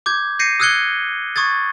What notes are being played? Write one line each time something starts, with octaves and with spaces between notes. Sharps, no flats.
D6 G6 G#6
G6 A#6 C7 C#7 D#7
D#6 E6 F#6 G#6 C#7 G7
C#6 D#6 G#6 A6